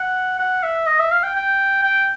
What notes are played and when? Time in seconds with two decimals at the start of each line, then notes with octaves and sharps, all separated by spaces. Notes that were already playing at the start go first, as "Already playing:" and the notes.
Already playing: F#5
0.39 F#5
0.63 E5
0.87 D#5
0.99 E5
1.12 F5
1.23 G5
1.36 G5
1.83 G5